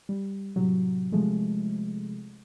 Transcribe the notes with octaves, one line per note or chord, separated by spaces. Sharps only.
G3
A2 C3 F#3
C3 F3 G#3 A3